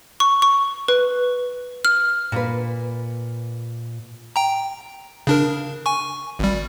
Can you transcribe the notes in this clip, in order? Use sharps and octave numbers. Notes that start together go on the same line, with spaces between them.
C#6
C#6
B4
F6
A#2 B4
G5 A#5
C#3 D4 A#4
G#5 C#6
G#1 G3